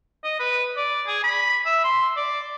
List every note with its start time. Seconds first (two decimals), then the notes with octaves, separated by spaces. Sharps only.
0.24 D#5
0.39 B4
0.76 D5
1.07 G#4
1.23 B5
1.65 E5
1.84 C6
2.16 D5